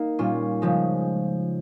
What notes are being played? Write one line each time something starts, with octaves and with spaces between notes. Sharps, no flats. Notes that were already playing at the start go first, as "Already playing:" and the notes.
Already playing: A#3 D#4
A#2 G3 C#4 F4
C#3 F3 G#3